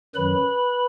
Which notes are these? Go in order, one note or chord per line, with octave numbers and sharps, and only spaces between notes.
F#2 D#3 F#3 B4 B5